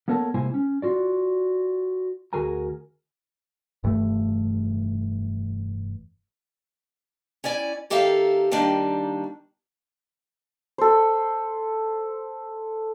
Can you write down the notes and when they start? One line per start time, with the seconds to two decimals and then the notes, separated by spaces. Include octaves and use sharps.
0.08 A#3 B3 A4 A#4 C#5 A5
0.34 C3 G#3 A#3 E4 C5 G#5
0.54 C#4
0.82 F4 F#4 D5
2.33 D2 F#4 G#4 A#4 G#5 A#5
3.83 F1 G2 E3 A3
7.44 C#4 E4 D5 G#5
7.90 D#3 G4 A4 A#4 E5 F5
8.52 D#3 G3 A#3 D4
10.78 A4 C5